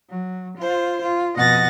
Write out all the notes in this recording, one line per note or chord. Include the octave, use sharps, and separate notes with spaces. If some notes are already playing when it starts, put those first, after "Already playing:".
F#3
F4 C5
F4
F2 B2 D#5 F#5 A6 A#6